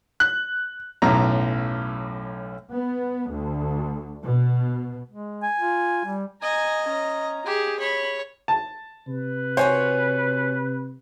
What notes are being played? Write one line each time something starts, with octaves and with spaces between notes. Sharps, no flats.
F#6
B1 F#2 A2 A3 A#5
B3
D2
B2
G#3
G#5
F4
G3
D#5 G#5 A#5
C#4 A#5
G4 G#4
C#5 B5
A5
C3 B4
B3 F#4 C5 C#5 G#5